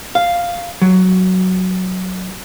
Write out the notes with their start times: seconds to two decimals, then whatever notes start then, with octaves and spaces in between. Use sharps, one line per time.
0.15 F5
0.82 F#3